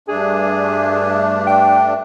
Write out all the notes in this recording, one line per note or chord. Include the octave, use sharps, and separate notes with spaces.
G2 A3 D4 G#4
G5